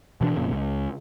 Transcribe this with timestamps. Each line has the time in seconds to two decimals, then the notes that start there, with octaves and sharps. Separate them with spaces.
0.21 B2 E3 D4
0.35 F1 F2 A#2 C#3
0.52 C#2